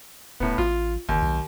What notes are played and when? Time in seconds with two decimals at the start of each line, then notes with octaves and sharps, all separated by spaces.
0.40 D#1 A2 B3
0.58 A1 F4
1.09 G1 D#2
1.22 B1